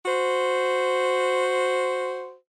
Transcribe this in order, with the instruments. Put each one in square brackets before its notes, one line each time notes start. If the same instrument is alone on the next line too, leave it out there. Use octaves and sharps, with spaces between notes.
[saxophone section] F#4 C5